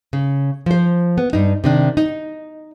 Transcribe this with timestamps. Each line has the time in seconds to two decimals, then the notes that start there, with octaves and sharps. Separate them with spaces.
0.13 C#3
0.66 F3 C5
1.18 B3
1.33 G2 D#4
1.64 C3 D#3 D4
1.97 D#4